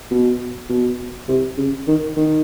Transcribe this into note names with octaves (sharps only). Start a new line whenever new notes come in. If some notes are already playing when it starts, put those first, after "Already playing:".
B2
B2
C3
C#3
D#3
D#3